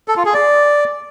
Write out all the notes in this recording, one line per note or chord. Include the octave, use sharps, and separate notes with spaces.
A4
F4
G#4
D5